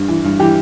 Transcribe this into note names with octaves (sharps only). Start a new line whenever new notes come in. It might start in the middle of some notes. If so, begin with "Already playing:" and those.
Already playing: G2
E3
G2
E3 G4